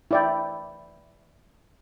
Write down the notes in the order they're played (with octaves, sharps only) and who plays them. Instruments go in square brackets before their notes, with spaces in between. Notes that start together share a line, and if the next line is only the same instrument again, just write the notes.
[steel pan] E4 D5 G5